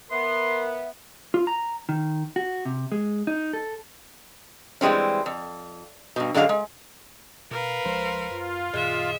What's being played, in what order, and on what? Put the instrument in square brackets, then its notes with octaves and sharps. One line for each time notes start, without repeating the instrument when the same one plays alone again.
[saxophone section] B3 [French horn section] A#4 [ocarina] E5 [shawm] C6
[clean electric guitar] F4
A#5
D#3
F#4
C3
G#3
D#4
A4
[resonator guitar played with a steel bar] E3 G3 G#3 C4 C#4
F2
G2 B2
F#2 D3 G#3 F4 F5
G#3
[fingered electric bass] B2 [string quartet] A#4 B4 F5
[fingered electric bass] C#2 F3 G#3 [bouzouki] C5
[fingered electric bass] F#2 [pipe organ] F4
[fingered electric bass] F#2 A#2 D#3 [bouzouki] G#3 [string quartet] E5